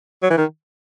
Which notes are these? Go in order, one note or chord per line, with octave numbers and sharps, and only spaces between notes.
F#3
E3
D#3